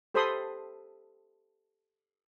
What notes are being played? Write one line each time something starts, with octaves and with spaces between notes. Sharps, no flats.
G4 A4 C5 B5 C6 D#6